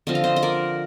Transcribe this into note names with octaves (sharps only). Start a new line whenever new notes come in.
D3 F3 C4 D#5
F5
C5 D#5
D#5
A#4 D5